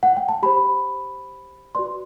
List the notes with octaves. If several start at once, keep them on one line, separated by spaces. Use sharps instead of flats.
F#5
G5
A5
G4 C5 B5
F#4 B4 D5 C6